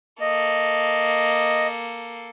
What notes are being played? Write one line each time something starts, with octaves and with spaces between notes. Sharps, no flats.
A#3 A4 D#5